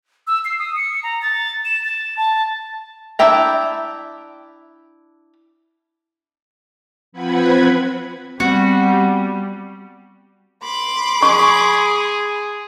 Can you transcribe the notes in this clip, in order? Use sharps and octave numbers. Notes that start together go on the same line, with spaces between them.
E6
C7
D#6
C#7
A#5
A6
E7
A6
A5
D4 E4 E5 G5 A#5
F3 C4 B4 F#5 B5 G#6
G3 B3 C4 F#4
B5 C6 D6
G#4 C#6